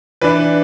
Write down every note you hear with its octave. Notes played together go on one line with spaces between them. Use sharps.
E3 D4 B4